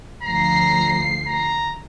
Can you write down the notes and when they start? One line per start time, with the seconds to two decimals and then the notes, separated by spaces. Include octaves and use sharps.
0.23 D2 F3 A#5 C7
1.27 A#5